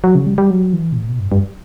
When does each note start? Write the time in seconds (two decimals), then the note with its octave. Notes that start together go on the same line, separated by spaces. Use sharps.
0.04 F#3
0.15 C#3
0.27 G3
0.38 G3
0.50 F#3
0.73 E3
0.92 B2
0.97 A2
1.09 B2
1.19 G2
1.32 G2